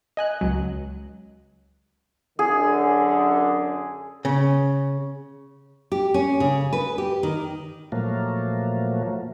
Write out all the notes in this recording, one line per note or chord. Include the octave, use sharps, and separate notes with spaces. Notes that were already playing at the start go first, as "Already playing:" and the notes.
D#5 G#5 F#6
C#2 F#3
F#2 D3 G#4
C#3
G4
C#4
C#3
B4
G4
D#3
A#2 F3 F#3 A3 A#3